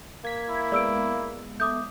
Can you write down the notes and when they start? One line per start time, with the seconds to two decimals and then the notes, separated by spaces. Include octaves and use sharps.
0.25 A#3 G#6 B6
0.49 E4
0.72 G#3 B3 D5 E6 D7
1.60 A3 D6 D#6 G6